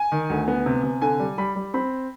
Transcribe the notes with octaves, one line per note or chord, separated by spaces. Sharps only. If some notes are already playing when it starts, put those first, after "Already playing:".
Already playing: G#5
D#3
D2
B3
C3
C3
D3 G#5
G3
G3 B5
G3
C4 B5